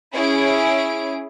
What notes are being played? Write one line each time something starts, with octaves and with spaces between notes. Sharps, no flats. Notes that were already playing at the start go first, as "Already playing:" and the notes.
C#4 E4 G#4 D7